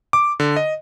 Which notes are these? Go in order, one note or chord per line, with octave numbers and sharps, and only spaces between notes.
D6
D3
D#5